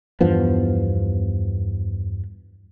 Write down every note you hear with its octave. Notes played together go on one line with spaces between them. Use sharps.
E2 G2 F3 B3